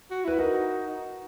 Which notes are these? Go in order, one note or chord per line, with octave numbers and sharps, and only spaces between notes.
F#4
E4 B4
D#4 F#4 A#4